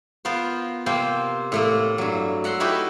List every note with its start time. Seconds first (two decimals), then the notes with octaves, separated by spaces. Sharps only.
0.25 B3 F4 A#4 C5
0.86 C3 A#3 C4 C5
1.52 A2 A3 A#3
1.98 G2 F#3
2.44 E5 F#5 A#5 C6
2.60 A3 D#4 E4 F#4 G4 B4